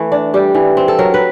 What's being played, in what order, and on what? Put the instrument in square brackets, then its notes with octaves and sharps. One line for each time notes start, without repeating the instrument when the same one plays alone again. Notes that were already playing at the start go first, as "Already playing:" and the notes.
Already playing: [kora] E3 A3
D4
G3 G4
E3
C4
A4
F#3 A#4
B4